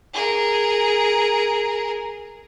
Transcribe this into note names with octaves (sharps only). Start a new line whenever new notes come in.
G#4 A#4